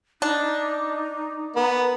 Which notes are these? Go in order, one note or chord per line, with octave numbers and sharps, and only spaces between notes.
D4 D#4
B3 A#4